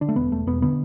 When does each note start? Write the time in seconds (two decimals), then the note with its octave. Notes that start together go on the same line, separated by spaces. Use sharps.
0.01 D3 D4
0.09 A3
0.16 E1 B3
0.31 E1 A3
0.47 E1 B3
0.62 D3 B3